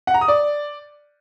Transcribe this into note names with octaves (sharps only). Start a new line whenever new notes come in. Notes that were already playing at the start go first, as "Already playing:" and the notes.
F#5
A#5
D#6
D5